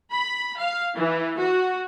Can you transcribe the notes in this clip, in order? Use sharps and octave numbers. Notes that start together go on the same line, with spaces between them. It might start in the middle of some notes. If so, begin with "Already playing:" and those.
B5
F5
E3
F#4